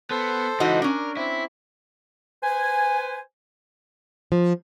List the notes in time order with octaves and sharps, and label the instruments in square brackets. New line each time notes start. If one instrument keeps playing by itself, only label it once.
[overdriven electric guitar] B3 [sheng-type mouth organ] A4 C5
[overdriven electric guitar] C#2 E3 [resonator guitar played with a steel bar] D#4 F#4 D#5
[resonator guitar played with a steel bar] C#4 D4 [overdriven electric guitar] A#4
[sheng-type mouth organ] C4 [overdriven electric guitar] E4
[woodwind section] B4 C5 G#5
[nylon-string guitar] F3